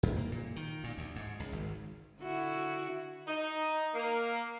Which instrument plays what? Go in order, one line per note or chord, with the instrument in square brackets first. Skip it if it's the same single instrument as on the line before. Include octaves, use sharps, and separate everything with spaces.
[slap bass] F#2
A#3
A#2
D#3
A#2
D2
G#2
C#2
G#1
[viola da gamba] D3 E4 F#4
[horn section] D#4
A#3